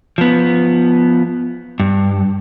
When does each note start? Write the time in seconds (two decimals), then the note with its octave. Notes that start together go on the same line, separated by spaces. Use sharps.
0.18 F3 B3
1.80 G2